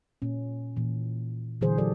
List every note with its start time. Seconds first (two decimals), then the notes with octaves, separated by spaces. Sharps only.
0.22 A#2 C#4
0.76 A#2 E3
1.61 A#2 D3 E3 F#3 G#4 C5
1.78 F#3 G4 A4 C5 D5